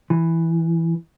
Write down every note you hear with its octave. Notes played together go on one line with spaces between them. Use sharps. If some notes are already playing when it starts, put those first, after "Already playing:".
E3